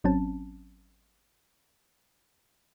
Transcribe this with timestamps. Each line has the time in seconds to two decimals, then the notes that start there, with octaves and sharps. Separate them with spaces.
0.04 G#1 F#3 C4 C#4 A5